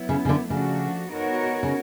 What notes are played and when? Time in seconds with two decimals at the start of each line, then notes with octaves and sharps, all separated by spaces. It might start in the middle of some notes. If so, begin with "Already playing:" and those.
Already playing: F#3 B3 E4
0.09 C#3
0.25 C#3
0.29 D3
0.50 C#3 F3 A3 D4 F#4
1.10 B3 D#4 F#4 A#4 C#5
1.63 C#3